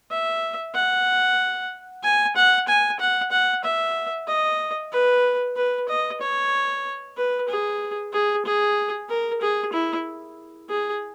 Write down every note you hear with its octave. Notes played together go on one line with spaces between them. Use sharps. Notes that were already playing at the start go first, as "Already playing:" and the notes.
E5
F#5
G#5
F#5
G#5
F#5
F#5
E5
D#5
B4
B4
D#5
C#5
B4
G#4
G#4
G#4
A#4
G#4
E4
G#4